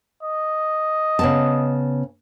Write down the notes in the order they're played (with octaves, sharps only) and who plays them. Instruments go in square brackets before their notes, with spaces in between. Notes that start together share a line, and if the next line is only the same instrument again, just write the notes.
[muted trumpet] D#5
[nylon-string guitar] C#3 B3 A5